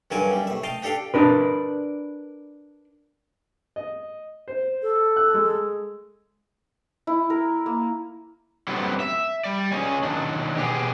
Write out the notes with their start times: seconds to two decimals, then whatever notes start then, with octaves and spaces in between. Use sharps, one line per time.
0.11 G2 D3 F#3 A#4 G#5 A5
0.31 F#2 G3
0.47 A2 E5
0.63 D#5 F5 G5 A5
0.82 D4 G4 A4 F5 G5
1.14 D4 A#4 B4
3.76 D#5
4.48 C5
4.82 A4
5.17 F#6
5.34 G#3
7.07 E4
7.30 A#4
7.66 A#3
8.68 D3 F#3 G3 A3 B3 C4
9.00 E5
9.44 G3 D5
9.72 C#4 G#4 C#5 D#5 G#5
10.03 D#3 F#3 D4
10.57 B2 G4 G#4